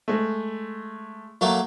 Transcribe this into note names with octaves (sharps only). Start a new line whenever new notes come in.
G#3 A3
F#3 A3 A#3